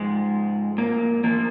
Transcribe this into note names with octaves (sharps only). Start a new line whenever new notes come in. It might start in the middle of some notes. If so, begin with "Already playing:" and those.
Already playing: G#2 F3 G#3
A#3
F3 A#3